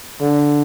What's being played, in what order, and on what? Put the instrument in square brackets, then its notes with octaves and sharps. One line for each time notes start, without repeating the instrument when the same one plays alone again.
[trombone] D3